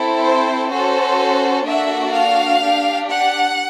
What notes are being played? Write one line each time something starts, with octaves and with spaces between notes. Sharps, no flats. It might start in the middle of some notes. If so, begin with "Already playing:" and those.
Already playing: C4 E4 A4
C5
C#4 F#4 A4 C5
A#3 D4 F#4 A4 E5
F5
D4 G4
F#5